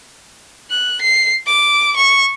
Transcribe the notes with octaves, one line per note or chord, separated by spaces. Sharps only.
F#6
C7
D6
C#6